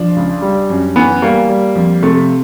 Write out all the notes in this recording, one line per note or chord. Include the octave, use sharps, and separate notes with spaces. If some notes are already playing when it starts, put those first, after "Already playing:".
Already playing: F3 D4
C#2
G3
F#2
E3 B3
G3 A#3
G3
F2
C3 A3